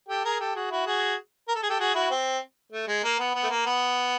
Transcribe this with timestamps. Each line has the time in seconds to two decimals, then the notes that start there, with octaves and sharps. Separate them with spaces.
0.09 G4 A4
0.24 G#4 A#4
0.40 G4 A4
0.55 F#4 G#4
0.71 E4 F#4
0.86 F#4 G#4
1.48 A#4
1.55 A4
1.63 G#4
1.69 G4 A4
1.80 F#4 G#4
1.95 E4 F#4
2.10 C4
2.72 A3
2.87 G#3
3.04 A#3
3.19 B3
3.35 B3
3.43 A3
3.49 A#3
3.66 B3